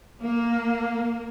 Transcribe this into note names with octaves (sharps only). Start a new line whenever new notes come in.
A#3